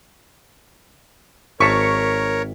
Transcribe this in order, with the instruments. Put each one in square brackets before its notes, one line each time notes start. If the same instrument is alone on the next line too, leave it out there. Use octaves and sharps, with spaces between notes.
[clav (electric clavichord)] G#1 A5 [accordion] A#4 C#5 [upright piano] C#6 B6 C#7